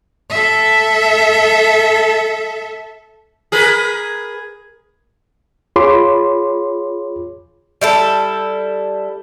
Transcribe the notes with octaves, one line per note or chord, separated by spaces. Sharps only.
A4 E5
G#4 A#4 B4
F4 G#4 C#5 B5 C6 D6
G3 E4 A4